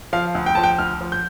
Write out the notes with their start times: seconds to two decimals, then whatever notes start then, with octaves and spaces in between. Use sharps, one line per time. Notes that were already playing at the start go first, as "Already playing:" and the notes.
0.13 F3 F5
0.35 D2
0.46 G5
0.55 F3 A5
0.63 G5
0.79 D2 F6
1.01 F3
1.12 G6